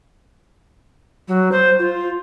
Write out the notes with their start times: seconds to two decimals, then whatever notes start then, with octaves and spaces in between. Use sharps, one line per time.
1.28 F#3
1.52 C5
1.79 F4